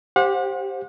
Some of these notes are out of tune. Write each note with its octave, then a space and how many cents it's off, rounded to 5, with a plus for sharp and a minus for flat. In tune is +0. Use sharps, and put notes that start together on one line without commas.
G4 +0 C5 +15 F#5 -35